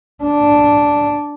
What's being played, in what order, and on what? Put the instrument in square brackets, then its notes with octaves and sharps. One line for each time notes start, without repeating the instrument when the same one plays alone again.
[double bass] D4